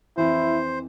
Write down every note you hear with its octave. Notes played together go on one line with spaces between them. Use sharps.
F2 E3 E4 C5